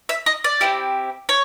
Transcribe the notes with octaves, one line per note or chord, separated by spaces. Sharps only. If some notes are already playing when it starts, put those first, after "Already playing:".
E5
D#5
D5
C4 E4 G4
C#5